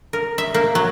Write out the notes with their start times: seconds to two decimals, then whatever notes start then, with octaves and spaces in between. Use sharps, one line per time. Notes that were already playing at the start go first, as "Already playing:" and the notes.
0.13 A#4
0.38 E5
0.54 A#3
0.75 F#3